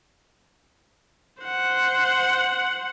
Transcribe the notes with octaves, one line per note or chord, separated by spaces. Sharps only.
C5 F#5